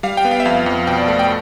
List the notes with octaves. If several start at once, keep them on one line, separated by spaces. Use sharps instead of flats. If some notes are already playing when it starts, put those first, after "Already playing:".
G3 F5
G5
B3
F5
E5
F2 F5
F2
B2 G5
D5
A3
G5